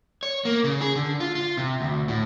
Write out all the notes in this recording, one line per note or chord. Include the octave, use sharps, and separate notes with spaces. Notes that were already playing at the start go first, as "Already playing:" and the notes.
C#5
A#3
C#3
G#4
D3
F4
F4
C3
D2
A2